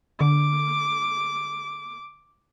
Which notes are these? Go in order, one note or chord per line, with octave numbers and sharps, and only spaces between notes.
D3 D6